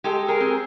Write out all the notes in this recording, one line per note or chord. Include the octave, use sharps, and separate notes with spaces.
G#3 G4 A4
G#4 A#4
C4